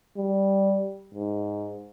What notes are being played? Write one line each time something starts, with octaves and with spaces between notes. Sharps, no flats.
G3
G#2